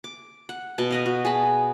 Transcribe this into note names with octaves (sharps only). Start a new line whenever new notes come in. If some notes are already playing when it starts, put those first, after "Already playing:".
D6
F#5
B2 A5
B4 D#5 F5
F#4
G#4 A5 B5